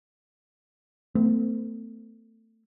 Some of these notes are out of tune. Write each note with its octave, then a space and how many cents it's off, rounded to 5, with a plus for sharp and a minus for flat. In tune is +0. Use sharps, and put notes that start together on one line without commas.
A3 +30 C4 -40